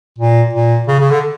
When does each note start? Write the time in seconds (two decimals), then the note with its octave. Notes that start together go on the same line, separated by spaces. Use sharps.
0.19 A#2
0.53 A#2
0.88 C#3
1.00 C#3
1.11 D3